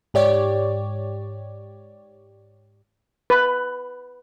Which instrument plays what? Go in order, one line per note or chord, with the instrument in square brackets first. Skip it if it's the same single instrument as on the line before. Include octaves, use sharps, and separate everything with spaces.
[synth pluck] G#2 G4 C#5 D5
[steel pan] B4